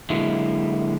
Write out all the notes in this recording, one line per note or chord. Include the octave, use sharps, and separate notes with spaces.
D3 F#3 G#3 A#3 E4